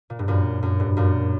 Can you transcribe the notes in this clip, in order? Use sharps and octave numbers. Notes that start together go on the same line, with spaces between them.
A#2
G2
F#2 A#2
F#2
G2
F#2 A#2